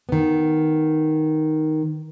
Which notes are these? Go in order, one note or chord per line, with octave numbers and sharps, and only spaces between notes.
D#3 B3